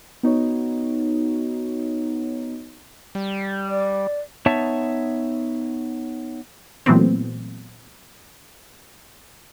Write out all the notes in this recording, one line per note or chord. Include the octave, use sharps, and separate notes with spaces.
B3 D#4 F#4 C#5
G3
D5
B3 D#4 C#5 E5 A5
A#2 E3 F#3 A3 B3 C4